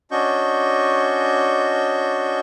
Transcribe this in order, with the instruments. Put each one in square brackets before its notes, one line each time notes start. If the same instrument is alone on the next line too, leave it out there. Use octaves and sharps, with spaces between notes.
[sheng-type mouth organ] C#4 D4 F#4 D#5 C#6 G6